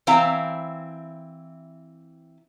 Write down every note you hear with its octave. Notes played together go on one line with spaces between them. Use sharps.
E3 C4 E4 F5 A#5